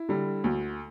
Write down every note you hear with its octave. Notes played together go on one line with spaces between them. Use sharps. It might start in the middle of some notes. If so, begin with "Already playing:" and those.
Already playing: E4
D3 G3
D2